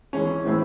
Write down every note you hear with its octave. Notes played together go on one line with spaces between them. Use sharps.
E3 G#3 C#4
A2 E3 G#3 C4 E4